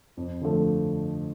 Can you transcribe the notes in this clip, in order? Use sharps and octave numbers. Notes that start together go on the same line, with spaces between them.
F2
D3 F3 A3